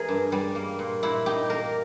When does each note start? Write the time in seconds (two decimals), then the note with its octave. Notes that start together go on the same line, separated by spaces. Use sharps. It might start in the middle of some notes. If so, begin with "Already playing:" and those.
Already playing: E3 G#4 A#4 C#5
0.08 G2
0.32 G3
0.55 A#3
0.79 A#2
1.03 A#2 E4
1.26 D#4 G4
1.49 A#3 A#4